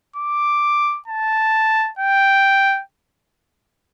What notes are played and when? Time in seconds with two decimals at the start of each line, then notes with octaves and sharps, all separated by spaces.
0.16 D6
1.08 A5
1.99 G5